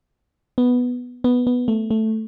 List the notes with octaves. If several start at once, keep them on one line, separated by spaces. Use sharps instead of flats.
B3
B3
B3
A3
A3